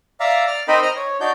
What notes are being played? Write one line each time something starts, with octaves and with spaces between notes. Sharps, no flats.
D5 E5 F5 A#5
D5 F6
C4 D#4 A#4 C5 D#5 B5
D#5 A#5 F6
C#5
D4 D#4 F#4 D5 G6